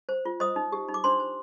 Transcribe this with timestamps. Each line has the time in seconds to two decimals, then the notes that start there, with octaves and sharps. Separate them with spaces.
0.09 C5
0.25 F4
0.40 C5 D#5 D#6
0.56 D#4
0.72 G4
0.88 D#4
0.94 D6
1.04 D4 C5 C6
1.20 C5